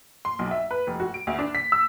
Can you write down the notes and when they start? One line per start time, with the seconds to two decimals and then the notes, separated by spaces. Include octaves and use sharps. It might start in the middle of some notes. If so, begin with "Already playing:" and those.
0.25 C6
0.39 B1
0.51 E5
0.71 B4
0.87 F1
1.00 F#4
1.14 D7
1.27 D2
1.39 D4
1.55 B6
1.72 E6